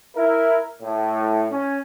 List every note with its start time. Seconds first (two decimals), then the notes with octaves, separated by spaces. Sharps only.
0.16 E4 A#4
0.82 A2
1.50 C#4